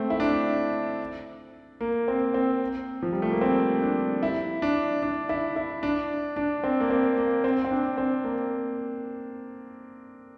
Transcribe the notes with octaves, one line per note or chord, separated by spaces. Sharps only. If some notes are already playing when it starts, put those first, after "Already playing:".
Already playing: A3 C4
E4
D4
A#3
C4
C4
F3
G3
A3
A#3
C4
D4
E4
D4
D4
E4
E4
D4
D4
C4
A#3
C4
A#3
C4
C4
D4
C4
A#3